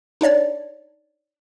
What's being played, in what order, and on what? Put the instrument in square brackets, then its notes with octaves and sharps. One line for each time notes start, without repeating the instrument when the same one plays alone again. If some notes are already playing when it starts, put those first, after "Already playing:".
[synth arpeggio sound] D4 D#4 C#5 D5